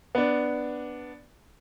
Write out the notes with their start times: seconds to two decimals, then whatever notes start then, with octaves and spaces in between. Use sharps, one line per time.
0.15 B3 D4